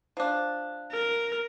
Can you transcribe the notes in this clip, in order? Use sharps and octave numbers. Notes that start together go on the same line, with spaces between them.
F3 D4
A#4